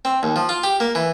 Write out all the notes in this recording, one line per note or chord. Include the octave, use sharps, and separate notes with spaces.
C4
D#2
F3
F4
G4
A#3
E3